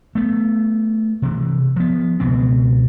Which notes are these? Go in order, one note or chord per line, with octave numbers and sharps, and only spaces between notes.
A3 B3
C3 E3
F3 B3
C#2 B2 B3 C4